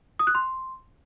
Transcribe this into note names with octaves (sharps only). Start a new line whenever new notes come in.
D#6
F#6
C6